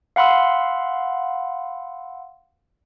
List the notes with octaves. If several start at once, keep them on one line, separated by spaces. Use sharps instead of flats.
F5 F#5 B5 C6 E6